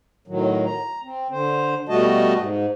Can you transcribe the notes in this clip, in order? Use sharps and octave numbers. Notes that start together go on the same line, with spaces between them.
A2 D#3 F#3
A#5
C4
D3 C5
B2 G3 A3 F#4 D#5 A5
G#2